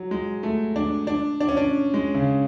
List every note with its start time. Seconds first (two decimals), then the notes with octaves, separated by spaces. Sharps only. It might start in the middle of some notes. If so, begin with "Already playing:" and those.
Already playing: F#3
0.11 G#3
0.43 A3
0.76 D4
1.07 D4
1.40 D4
1.49 C#4
1.57 D4
1.94 G#3
2.14 C#3